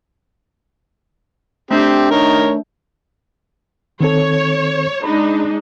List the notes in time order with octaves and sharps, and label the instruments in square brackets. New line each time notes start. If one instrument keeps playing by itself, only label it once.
[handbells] A3 D4 [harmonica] C4 G4
[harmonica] D#3 A#4 C#5
[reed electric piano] D#3 C4 A4 [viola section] C#5
[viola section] G#3 D4 D#4 [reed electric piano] B5